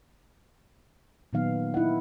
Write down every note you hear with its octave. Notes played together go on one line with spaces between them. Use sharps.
A#2 D#3 F#3 B3 D#4 F5
D#4 E4 D#5 F#5